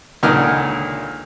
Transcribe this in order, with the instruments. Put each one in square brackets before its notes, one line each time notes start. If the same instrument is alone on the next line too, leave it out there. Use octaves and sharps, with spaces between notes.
[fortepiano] C#2 A#2 D3 D#3 D#5 F6